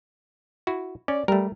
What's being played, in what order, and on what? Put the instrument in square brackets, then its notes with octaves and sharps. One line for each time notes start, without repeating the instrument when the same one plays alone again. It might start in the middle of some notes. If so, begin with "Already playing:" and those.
[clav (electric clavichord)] E4 F#4
[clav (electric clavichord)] C#4 [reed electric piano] D5
[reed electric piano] G3 [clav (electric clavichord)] A3 A#4